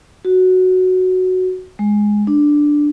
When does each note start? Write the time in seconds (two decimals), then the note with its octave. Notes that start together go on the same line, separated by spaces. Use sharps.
0.25 F#4
1.79 G#3
2.27 D4